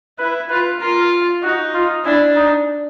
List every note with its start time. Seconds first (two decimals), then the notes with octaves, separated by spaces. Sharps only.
0.19 E4 B4
0.49 F4 B4
0.80 F4 A#4
1.43 D#4 F#4
1.74 F4
2.04 D4 E4
2.36 D#4